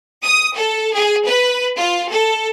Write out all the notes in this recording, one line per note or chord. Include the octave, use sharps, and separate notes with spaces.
D#6
A4
G#4
B4
F4
A4